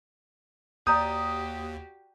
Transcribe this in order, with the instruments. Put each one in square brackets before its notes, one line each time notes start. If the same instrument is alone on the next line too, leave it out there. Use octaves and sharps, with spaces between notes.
[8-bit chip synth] D#2 [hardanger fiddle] F#4 G4 [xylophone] D5 A#5 G6 [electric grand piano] D#6